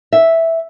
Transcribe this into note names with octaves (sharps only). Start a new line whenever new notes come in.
E5